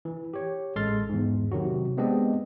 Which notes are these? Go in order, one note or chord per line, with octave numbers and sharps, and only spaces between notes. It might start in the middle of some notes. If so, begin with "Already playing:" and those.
E3
G4 C#5
A1 G#3 A4 C6 F6 A6
E2 G#2
C3 D#3 F#3 F#4
G#3 B3 C4 D4 G4 D#5